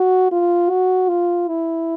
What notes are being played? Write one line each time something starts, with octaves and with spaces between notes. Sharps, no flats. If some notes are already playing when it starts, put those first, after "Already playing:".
Already playing: F#4
F4
F#4
F4
E4